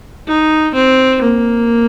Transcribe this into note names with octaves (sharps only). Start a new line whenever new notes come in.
D#4
C4
A#3